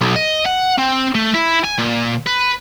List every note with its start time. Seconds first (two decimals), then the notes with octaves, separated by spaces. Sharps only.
0.01 B1
0.16 D#5
0.46 F#5
0.78 C4
1.15 A3
1.34 E4
1.64 G#5
1.78 A#2
2.26 B4